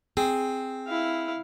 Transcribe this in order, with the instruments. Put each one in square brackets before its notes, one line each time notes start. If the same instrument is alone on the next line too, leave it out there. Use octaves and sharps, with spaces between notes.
[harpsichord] C4 [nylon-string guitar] G#4
[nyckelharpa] E4 F5